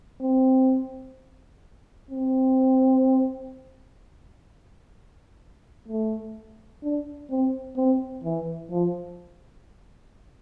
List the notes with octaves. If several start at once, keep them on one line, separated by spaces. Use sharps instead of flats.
C4
C4
A3
D4
C4
C4
E3
F3